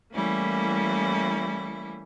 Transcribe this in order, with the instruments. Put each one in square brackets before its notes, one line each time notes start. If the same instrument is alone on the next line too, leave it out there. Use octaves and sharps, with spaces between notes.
[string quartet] E3 G3 A3 A#3 C#4 E4